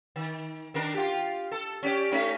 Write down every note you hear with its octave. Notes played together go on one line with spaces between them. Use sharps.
D#3
D#3 D4 A#4
F4 G4
A4
C#4 G4 D5
A3 C#4 D#4